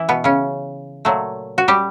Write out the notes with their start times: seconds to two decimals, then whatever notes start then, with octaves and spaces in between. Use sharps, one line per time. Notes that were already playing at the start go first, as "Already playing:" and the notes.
Already playing: E3 E4
0.09 B2 B3
0.24 C#3 C#4
1.05 A#2 F#3 A3
1.58 F#4
1.68 G3 G4